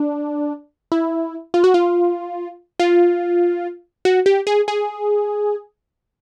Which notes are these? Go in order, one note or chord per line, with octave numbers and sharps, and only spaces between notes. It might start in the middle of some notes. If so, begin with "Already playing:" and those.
Already playing: D4
E4
F4
F#4
F4
F4
F#4
G4
G#4
G#4